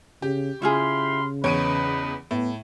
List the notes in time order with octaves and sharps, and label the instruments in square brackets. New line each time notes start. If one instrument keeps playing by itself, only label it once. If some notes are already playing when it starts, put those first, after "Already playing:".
[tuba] C#3 [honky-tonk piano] G4
[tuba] C#3 [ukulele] E4 F4 G#4 [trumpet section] F5 B5 C6
[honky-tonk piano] E2 D7 D#7 [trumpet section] D#4 B4 [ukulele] C#5
[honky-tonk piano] A2 [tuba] B3